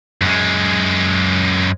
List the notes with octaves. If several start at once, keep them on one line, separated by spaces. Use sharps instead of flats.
F#2 G#3